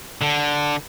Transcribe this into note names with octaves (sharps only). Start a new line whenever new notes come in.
D3